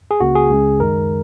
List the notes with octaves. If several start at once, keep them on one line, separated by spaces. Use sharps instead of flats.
G#4
C#2 C#3 A#3 F#4
G#4
C#2 C#3 G#3
F#2 D#3 G#3 A#4